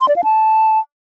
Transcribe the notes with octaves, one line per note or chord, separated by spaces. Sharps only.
C6
D5
F5
A5